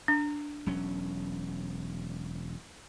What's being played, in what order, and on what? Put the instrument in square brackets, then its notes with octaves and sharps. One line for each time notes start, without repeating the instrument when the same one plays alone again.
[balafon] D4
[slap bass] E1 F#3 C#4